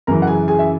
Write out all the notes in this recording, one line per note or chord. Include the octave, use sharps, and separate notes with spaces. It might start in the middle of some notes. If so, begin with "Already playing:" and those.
F#2 C#3 E3 A#4 A#5
F#5
G#4 G#5
G#4 G#5
E5